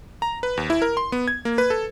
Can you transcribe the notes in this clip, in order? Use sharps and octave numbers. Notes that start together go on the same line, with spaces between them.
A#5
B4
D#2
E4
A#4
C6
B3
G#6
A#3
B4
A4